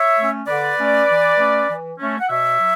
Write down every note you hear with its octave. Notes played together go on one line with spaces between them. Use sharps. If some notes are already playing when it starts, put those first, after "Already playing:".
Already playing: C#5 E5
A3 C#4
D3 B4 D5
A3 C#4
E3
A3 C#4
E3
A3 C#4
F#5
B2 C#5 E5
F#3